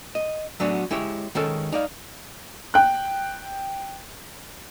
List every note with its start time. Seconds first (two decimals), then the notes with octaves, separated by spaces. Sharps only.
0.15 D#5
0.60 F#3 A3 B3 C#4 D4 F#4
0.91 G#3 E4 G4 C#5
1.35 D#3 G#3 C#4 A4
1.72 D#4 D5 F5
2.74 G5 F#6